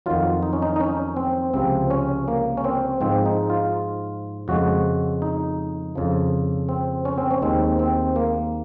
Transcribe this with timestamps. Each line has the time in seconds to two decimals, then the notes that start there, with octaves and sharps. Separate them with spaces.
0.06 F2 D#3 F#3 F4
0.43 D#4
0.53 C#4
0.62 D#4
0.76 D#4
0.80 C#4
1.16 C4
1.54 C#2 C3 F3 C4
1.90 C#4
2.28 A#3
2.57 C#4
2.64 C4
3.01 G#2 F3 G#3 C4
3.26 D#4
3.50 F4
4.48 F2 C#3 F3 G#3 F#4
5.22 D#4
5.95 F2 C#3 F3
6.69 C4
7.05 C#4
7.18 C4
7.31 C#4
7.42 D#2 D#3 G#3 C4
7.79 C4
8.16 A#3